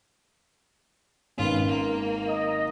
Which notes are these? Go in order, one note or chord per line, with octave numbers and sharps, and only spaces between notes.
G#1 C#4 F4 B4
A#3
D#5